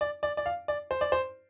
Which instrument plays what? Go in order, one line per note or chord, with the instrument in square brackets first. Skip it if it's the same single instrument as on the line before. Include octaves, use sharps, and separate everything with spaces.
[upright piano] D5
D5
D5
F5
D5
C5
D5
C5